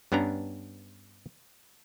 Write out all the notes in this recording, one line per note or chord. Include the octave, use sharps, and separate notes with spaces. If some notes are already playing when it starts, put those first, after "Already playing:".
G2 B3 C#4 D4 A#5